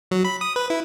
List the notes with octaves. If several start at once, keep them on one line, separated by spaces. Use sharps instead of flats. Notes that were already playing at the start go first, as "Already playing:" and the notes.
F#3
B5
D#6
B4
E4